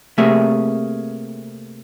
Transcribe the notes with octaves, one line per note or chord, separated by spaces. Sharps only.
C3 A3 A#3 G#4 E5